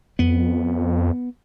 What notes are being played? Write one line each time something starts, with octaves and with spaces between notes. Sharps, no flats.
F2 B3